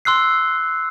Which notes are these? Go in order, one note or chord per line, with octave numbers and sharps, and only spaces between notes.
C6 E6 F#6 C7